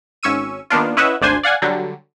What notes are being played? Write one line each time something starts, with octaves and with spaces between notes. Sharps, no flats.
G#1 C#4 C#6 E6 D#7
D#3 A#3 B3 D4 F4
C#4 E4 B4 D#5 E5 F#5
G#1 D2 D4 C5 G#5 C6
D5 F5 F#5 G#5
D3 F#3 G3